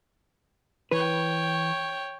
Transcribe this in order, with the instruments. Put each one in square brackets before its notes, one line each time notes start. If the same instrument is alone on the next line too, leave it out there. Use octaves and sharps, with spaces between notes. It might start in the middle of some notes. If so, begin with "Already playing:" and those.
[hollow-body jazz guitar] E3 B4 [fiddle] C#5 G5